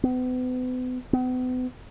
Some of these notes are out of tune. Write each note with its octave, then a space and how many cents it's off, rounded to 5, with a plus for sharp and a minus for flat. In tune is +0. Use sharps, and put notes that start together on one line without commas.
B3 +40
B3 +40